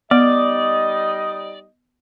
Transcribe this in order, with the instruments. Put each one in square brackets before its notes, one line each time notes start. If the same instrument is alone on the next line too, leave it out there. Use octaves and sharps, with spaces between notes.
[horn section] G3 D#4 D#5 [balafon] B3 [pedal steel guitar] D5